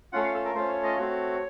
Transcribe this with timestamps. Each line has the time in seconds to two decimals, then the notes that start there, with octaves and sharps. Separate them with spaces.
0.13 A3 C#4 F4 F#5
0.23 F5
0.34 A4
0.45 A#4
0.55 A3 C#4 F4 C5
0.69 C#5
0.83 D#5
0.97 A3 C4 F#4 C#5